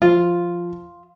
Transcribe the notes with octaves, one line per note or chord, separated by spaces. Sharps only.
F3 F4